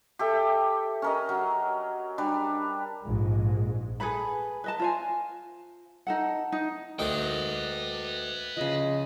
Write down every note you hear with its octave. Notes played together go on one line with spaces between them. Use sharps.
G4 A4 E5
C#4 A#4 D#5
F#3
G3 D4
A#1 G#2 G#3
G#4 A4 B4 B5
B4 D#5 A5
F4 C5 G#5
D#4 A4 F#5
D#4
D2 D#4 A#4 B4 G5
C#3 F3 D#5